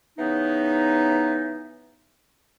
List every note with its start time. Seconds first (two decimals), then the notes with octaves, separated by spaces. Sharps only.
0.18 C#3 E3 B3 D#4